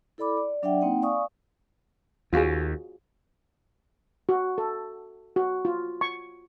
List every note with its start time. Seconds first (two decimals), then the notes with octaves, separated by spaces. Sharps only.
0.18 E4 A4 D5 B5 D6
0.37 D5
0.62 F#3 D4 D5 E5 F#5 G5
0.81 A#3 C4 D#4 F#5 G5
1.02 D5 F5 G#5 C#6 D#6
2.33 D#2 F4 F#4 G#4
4.29 F#4
4.58 A4
5.36 F#4
5.65 F4
6.01 C#6